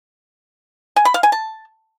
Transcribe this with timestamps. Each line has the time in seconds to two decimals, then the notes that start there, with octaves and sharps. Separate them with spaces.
0.96 G#5
1.05 B5
1.14 F5
1.23 G#5
1.32 A5